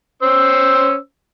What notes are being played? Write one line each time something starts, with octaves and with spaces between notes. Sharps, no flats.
C#4 C5 E6